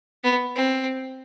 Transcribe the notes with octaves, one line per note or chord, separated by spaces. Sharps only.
B3
C4